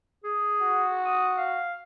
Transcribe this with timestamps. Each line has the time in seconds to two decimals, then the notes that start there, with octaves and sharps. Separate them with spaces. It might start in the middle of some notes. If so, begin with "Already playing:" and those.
0.24 G#4
0.61 F#4
1.05 D#6
1.37 F5